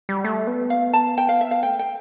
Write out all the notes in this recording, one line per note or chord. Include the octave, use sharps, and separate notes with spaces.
G3
A3
B3
F5
A5
G5
F5
E5
F5
A3 G5
G5